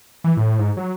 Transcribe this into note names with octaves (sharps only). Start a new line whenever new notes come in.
E3
A2
G#2
F#3